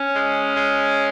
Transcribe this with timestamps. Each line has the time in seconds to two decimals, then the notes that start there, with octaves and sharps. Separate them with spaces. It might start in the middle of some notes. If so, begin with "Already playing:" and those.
Already playing: C#4
0.15 G#3
0.57 G#3